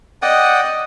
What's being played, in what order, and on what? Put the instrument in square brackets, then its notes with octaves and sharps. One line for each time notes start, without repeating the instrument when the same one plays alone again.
[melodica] D5 F#5 G5 [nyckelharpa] D#5